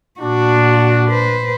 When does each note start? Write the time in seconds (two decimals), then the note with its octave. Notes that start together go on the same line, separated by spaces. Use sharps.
0.20 A#2 D4 F#4
1.10 B4 C5